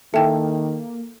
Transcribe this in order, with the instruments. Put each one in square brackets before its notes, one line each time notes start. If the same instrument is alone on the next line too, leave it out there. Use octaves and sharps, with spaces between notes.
[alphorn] D#3 [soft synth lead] A#3 [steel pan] E4 A4 [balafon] E5 G5